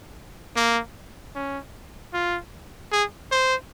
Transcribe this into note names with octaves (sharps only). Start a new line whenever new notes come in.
A#3
C#4
F4
G#4
C5